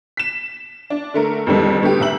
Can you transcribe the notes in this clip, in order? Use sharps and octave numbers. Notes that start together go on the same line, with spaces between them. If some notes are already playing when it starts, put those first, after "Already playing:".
B6 E7
D4
D3 A3 A#4
F2 B2 D3 D#3 G3 G#3
B2 D3 A3 G4
B1 E5 F#7